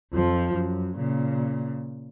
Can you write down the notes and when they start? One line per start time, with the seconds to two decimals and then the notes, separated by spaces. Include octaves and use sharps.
0.13 F2 F3
0.53 F#2
0.97 A#2 C#3